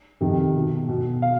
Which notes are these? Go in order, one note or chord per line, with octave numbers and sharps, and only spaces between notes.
F2 C3 D#3
B2
B2
F5